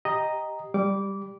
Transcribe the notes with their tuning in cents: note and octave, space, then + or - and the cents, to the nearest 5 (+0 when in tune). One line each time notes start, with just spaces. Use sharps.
G4 +0 D#5 +0 A#5 +0
G3 +5 D6 -20